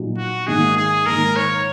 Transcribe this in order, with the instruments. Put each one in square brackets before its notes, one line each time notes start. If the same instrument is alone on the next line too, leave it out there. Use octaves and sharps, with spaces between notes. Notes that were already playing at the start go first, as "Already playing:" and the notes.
Already playing: [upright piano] A#2 F#3 D#4
[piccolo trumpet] F#4
[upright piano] G#2 D#3 A#3 D#4 [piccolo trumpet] G#4
[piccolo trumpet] G#4
[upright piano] G#2 D#3 A#3 D#4 [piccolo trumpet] A#4
[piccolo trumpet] C#5